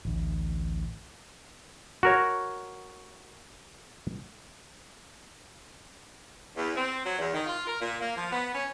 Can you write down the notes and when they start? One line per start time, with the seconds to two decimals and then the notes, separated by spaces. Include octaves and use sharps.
0.05 A1 D2
2.03 F#4 A#4 C#5
6.56 E2
6.76 C4
7.05 F#3
7.19 E2
7.34 D#3
7.46 F4
7.67 A#4
7.80 A#2
8.01 A#3
8.16 F3
8.32 B3
8.54 C#4